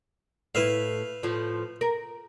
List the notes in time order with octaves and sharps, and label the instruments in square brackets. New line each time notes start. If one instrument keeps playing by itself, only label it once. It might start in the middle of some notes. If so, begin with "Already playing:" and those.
[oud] A2 E4 [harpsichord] B4 E5 F5
[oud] A2 F3
A#4